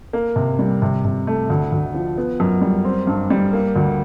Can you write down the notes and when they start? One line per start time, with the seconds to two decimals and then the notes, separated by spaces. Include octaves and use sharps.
0.13 A#3
0.36 C3
0.59 G3
0.82 C3
1.05 C3
1.27 A3
1.50 D2
1.72 D2
1.94 F3
2.18 B3
2.40 F#2
2.62 G3
2.85 C4
3.07 G2
3.30 G3
3.53 A#3
3.76 D2